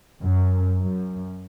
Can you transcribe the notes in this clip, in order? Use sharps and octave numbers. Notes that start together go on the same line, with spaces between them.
F#2
F#2